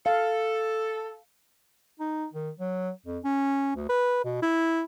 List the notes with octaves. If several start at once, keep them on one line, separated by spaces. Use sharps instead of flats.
A4 F5
D#4
D#3
F#3
F2
C#4
D2
B4
B2
E4